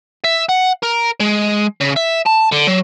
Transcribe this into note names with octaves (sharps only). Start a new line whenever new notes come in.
E5
F#5
A#4
G#3
C#3
E5
A5
D3
F#3